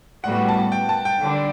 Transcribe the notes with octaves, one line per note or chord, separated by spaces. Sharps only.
A2 G3 B3 F#4 F#5
A5
G5
A5
G5
D3 G3 D4